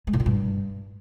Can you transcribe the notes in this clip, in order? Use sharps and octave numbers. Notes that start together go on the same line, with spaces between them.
G#3
A2
A#2
G2